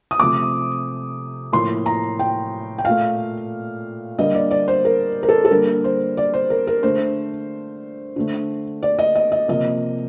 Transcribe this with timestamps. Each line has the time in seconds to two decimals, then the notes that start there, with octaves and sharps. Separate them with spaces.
0.11 D#6
0.20 C3 F3 A3 D6
1.52 A2 F3 A#3 C6
1.86 A#5
2.19 G5
2.78 G5
2.85 A#2 A3 F5
4.19 D3 G3 A#3 D#5
4.35 D5
4.51 D5
4.68 C5
4.85 A#4
5.23 A#4
5.29 A4
5.45 A4
5.51 D3 G3 A#3 A#4
5.84 C5
6.17 D5
6.34 C5
6.50 A#4
6.67 A#4
6.83 D3 A3 C5
8.16 D3 A3
8.83 D5
8.99 D#5
9.15 D#5
9.32 D#5
9.48 C3 F3 A#3 D#5